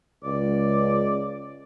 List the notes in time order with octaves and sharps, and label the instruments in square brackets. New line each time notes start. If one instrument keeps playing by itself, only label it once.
[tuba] C#2 [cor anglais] D5